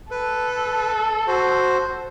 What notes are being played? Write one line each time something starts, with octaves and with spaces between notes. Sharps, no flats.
A4 B4
F#4 C5